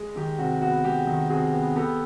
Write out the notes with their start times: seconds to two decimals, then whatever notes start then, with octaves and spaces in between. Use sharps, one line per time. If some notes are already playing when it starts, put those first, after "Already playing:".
Already playing: G#3
0.16 D#3 G4
0.38 C3 F#4
0.61 B3 F#4
0.85 G#3 G4
1.07 D#3
1.30 C3 F#4 G#4
1.53 B3
1.76 B3 G4 A4